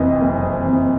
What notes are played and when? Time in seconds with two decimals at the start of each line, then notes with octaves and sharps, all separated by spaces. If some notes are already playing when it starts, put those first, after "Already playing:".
Already playing: F#1 F2 C3 E3 D#5
0.21 F#1
0.64 F2 C3 E3